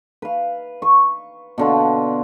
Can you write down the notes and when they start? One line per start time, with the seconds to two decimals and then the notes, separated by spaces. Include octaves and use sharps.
0.22 B4 F5
0.82 C#6
1.58 B2 D3 F4